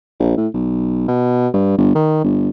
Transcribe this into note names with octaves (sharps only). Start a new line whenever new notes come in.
A#1
A2
B1
B2
G2
G1
D#3
G1